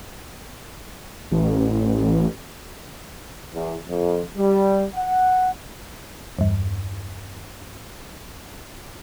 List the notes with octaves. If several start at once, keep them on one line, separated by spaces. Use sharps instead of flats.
A1
E2
F2
G3
F#5
E2 G2